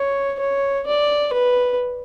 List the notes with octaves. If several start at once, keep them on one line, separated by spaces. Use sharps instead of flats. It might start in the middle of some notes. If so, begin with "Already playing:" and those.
Already playing: C#5
C#5
D5
B4